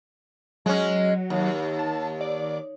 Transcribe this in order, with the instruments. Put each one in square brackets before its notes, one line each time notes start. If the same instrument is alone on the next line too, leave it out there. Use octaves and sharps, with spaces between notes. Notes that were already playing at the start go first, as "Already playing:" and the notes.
[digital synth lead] F#3 [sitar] G#3 C#4
[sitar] D#2
[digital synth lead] A5
D5